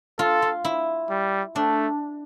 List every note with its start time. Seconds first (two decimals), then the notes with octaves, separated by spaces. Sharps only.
0.19 F4 A4
0.42 F4
0.65 E4
1.10 G3
1.56 A3 D4